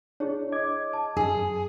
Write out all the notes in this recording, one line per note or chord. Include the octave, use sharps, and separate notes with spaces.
D4 E4 G#4 C#5
D#5 D6 G#6
A5
F#2 G#4